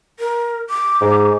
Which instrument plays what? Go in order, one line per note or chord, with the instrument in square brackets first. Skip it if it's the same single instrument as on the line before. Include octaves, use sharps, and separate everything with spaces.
[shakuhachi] A#4
D6
[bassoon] G#2